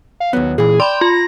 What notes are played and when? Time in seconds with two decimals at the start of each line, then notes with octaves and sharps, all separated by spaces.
0.20 F5
0.33 D#2 F#3 B3
0.58 A#2 E3 G#4
0.80 D5 G5 B5 C6
1.01 F4 A#6